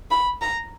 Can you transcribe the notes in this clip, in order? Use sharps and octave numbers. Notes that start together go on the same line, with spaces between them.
B5
A#5